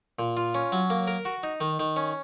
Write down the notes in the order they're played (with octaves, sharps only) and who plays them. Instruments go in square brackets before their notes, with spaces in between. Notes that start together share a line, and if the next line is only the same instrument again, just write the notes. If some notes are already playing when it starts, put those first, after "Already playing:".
[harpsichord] A#2
F4
C#4
F#3
A#3
A#4
F#4
D#4
D#3
D#3
C#4